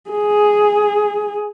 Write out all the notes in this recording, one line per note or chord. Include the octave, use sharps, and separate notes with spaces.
G#4